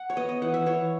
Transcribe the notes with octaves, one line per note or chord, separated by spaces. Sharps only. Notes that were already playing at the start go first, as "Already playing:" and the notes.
Already playing: F#5
C#5
B3 D#5
D#5
E3 F#5
E5
E3 C#5